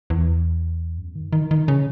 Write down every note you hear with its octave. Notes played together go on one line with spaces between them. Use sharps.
E2
F#2
D#3
D#3
D#3
C#3